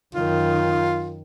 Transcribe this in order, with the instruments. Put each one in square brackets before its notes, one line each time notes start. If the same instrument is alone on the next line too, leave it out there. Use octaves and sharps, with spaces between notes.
[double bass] F#2 D#3 [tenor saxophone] F4